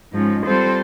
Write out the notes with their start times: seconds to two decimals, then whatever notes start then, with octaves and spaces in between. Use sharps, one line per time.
0.12 G#2 F3 G#3 C#4
0.44 G3 C4 F4 A4 C5